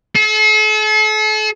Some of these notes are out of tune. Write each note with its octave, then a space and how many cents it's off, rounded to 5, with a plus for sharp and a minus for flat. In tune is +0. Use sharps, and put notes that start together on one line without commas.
A4 -40